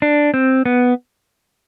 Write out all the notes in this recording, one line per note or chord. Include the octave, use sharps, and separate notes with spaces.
D4
C4
B3